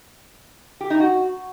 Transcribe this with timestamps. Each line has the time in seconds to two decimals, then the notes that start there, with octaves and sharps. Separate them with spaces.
0.81 G4
0.90 D#4
1.00 F#4